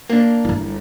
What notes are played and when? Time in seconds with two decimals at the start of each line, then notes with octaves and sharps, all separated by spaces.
0.10 A#3 D4
0.45 G1 E4